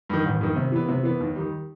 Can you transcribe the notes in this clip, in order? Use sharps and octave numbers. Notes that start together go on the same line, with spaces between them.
G2 D#3
A1
G2 D#3
C3
E3 B3
C3
E3 B3
D#2
D#3 G3